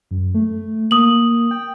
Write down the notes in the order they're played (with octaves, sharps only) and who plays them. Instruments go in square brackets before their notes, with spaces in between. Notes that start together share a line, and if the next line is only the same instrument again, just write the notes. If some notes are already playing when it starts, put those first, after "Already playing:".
[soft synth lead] F#2
A3
[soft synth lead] A#3 [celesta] D#6 F#7
[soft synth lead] G5